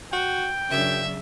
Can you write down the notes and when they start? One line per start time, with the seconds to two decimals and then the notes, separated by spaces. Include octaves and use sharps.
0.13 F#4 G5
0.70 F#2 C#3 F#3 D4 E5